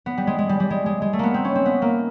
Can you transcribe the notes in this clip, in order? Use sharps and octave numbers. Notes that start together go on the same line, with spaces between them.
B3
G3
G#3
G#3
G3
G3
G#3
G#3
G#3
A3
A#3 B3
C4
C#4
C4
B3
A#3